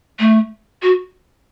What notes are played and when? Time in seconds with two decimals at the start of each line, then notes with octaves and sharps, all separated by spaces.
0.20 A3
0.83 F#4